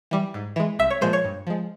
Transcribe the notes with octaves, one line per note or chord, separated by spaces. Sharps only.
E3 G3
G#2
E3 G#3
C2 E5
C#5
A#2 F3 G#3 C5
C#5
G2
F3 G#3